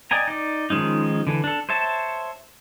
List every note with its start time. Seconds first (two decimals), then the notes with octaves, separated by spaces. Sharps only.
0.11 D5 D#5 G5 G#5 A#5
0.28 D#4 D5
0.70 D#3 F3 G#3 C#4 D#4
1.27 D3 E3
1.44 D4 A4
1.69 C5 C#5 E5 A5